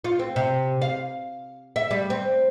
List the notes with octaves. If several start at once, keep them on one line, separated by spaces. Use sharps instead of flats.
F4
C4
C3
F5
E5
G3
C4